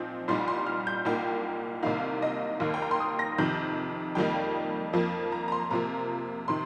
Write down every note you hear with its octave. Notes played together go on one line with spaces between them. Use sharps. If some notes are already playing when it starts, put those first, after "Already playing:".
Already playing: A#2 F3 C4 D#4
C2 A#2 G3 D#4 C6
C6
F6
G6
C2 A#2 A#3 D#4 G5
C2 C3 D#3 A#3 D#4 F5
D#5
D#2 D#3 A#3
G5
A#5
C6
D#6
A#6
F2 C3 D#3 G6
F2 D#3 G3 A#3 D#4 G5
F2 F3 A#3
A#5
A#5
C6
C3 F3 A#3 A#5
C3 D#3 C6